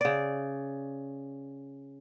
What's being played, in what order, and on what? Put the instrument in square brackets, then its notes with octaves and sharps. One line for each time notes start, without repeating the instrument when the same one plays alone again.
[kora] C#3 D5